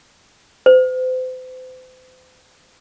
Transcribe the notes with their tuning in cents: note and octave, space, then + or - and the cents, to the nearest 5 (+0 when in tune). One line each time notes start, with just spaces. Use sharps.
C5 -40